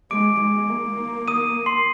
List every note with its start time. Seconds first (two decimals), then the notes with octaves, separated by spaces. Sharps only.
0.11 G#3 D6 D7
0.40 G#3
0.70 A#3
1.28 D#6 D#7
1.66 C6 C7